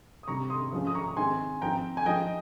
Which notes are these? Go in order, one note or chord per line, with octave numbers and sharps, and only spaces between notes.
D#6
C3 G3 C4 D#4 A#5 C#6
C6 D#6
F3 G#3 C#4
D#6
A#5 C#6
D#3 G#3 C4 D#4 G#5 C6
F3 C4 D#4 G5 A#5
G#5
F3 G#3 D#4 D#5 G5